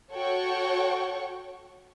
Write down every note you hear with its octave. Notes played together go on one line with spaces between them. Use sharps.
F#4 A4 C#5 F#5 G5 C#6